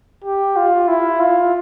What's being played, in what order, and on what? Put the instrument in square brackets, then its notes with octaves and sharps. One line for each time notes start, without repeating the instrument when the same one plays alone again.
[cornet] G4
F4
E4
F4